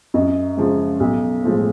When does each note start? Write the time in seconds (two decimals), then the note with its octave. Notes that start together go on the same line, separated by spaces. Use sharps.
0.14 F#2 D#5
0.57 C#3 F3 G#3
1.00 B1
1.43 A2 F3 G#3